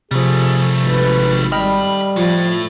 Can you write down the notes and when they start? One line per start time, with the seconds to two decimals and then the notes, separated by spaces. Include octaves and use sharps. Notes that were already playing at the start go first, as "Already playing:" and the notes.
0.11 C3 F3 G3 A3 G#4
0.83 G#1 B4
1.52 G3 A4 D#5 G5 B5 F6
2.17 A2 F3